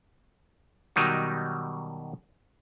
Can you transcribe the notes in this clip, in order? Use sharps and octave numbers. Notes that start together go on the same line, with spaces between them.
B2 D#3 F#3 G3 D#4